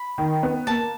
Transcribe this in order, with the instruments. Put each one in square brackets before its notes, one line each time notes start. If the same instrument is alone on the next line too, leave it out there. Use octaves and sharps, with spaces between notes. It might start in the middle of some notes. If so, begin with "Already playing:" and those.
Already playing: [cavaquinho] B5
[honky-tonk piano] D#3
B3
[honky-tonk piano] A#3 [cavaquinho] A5